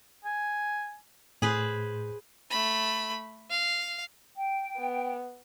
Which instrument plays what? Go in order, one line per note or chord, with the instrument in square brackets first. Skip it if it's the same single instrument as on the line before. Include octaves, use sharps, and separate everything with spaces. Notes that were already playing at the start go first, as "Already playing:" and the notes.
[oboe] G#5
[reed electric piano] A2 [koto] G#4 B4 C5
[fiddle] A3 B5
F5
[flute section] G5
[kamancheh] B3